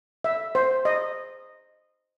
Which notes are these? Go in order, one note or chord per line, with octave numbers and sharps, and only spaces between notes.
E5
C5
D#5